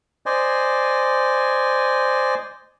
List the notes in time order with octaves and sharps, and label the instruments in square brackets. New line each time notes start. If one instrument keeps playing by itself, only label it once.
[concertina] C5 D5 D#5 G#5